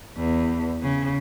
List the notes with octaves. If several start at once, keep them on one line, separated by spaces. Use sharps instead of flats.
E2
C#3